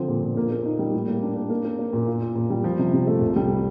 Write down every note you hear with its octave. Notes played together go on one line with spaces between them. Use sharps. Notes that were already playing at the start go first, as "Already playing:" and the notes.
Already playing: D3 F3 C4
A#2
A#2
A#3
A#3
D#4
G3
A2
A#3
D4
A#3
A#3
A#3
A#3
A#2
F4
F4
A#2
G3
F3
C3
C3
A3
C2
G3